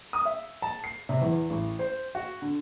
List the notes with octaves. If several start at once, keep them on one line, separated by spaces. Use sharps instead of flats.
D#6
E5
A5
C7
C3
E2
A1
C5
F#4
D3